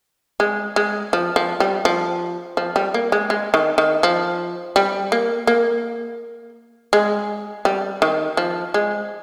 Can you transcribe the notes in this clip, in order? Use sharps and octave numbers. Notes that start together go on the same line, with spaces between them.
G#3
G#3
F3
F3
G3
F3
F3
G3
A#3
G#3
G#3
D#3
D#3
F3
G3
A#3
A#3
G#3
G3
D#3
F3
G#3